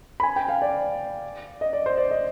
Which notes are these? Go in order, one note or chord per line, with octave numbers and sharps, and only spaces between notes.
B5
G#5
G5
F5
D5
D#5
D5
C5
D5
D#5